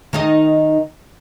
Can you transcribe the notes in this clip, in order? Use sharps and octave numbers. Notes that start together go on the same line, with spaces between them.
D#3 D#4 D#5